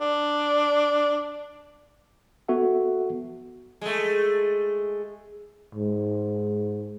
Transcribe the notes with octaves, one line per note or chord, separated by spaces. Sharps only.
D4
B3 F#4 A4 E5 F#5
G#3 A3
G#2